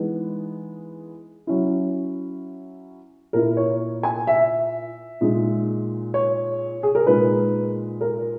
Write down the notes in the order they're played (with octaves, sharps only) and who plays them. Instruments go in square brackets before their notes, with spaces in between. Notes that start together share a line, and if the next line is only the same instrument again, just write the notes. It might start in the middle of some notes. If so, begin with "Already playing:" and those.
Already playing: [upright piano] E3 G#3 B3 D#4
F#3 C#4 E4
A#2 A#3 E4 A#4
C#5
G#5
E5
A#2 G#3 D#4
C#5
G#4
A#4
A#2 G#3 D#4 B4
A#4